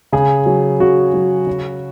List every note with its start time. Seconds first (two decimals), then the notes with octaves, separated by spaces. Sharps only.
0.13 C#3 G#4
0.46 F#3
0.80 C#3 F#4
1.14 F#3
1.47 C#3